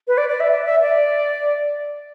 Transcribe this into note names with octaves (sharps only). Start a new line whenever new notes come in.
B4
D5
D5
E5
D5
E5
D5